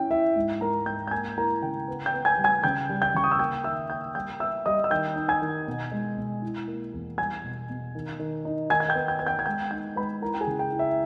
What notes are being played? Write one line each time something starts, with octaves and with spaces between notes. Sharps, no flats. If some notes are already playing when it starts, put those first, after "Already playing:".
Already playing: C#4 E4 G5
E4 E5
G#2
G#2 A#4 A#5
G#2 G5 G6
G6
A#3 G#5 G#6
E4 A#4 A#5
C#3 G5
B3
G5 G6
B3
G#5 G#6
G3
G#5 G#6
C#3 G5 G6
G3
G5 G6
C#3 C#6
D#6
E6
A#3 G5 G6
D#3 E5 E6
A#3 G5 G6
G3 G5 G6
B3 E5 E6
G3 D#5 D#6
E6
D#3 G5 G6
D#4
G#5 G#6
D#3
B2
G#3
B2
E4
A#3
E2
G3 G#5 G#6
B2
B2
D#3
D#3
D#4
D#3 G#5 G#6
G#6
G5 G6
B3
G5 G6
B3 G#6
G5 G6
G#6
G#3 G5 G6
D#4 G5 G6
G#3 B4 B5
E4 A#4 A#5
G5
G#4 G#5
C#3
G5
E4
E5